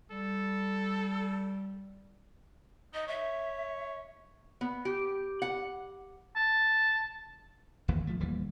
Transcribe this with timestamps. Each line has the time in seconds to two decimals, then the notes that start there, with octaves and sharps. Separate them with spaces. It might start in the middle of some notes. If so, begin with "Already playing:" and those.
0.11 G3 A4
2.93 D#4 D#5
3.08 C#5 E5
4.61 B3
4.85 G4
5.42 F#5
6.36 A5
7.88 D1 G#1 D#2 E3
8.07 F3 A3
8.20 D1 D#2 E3 G3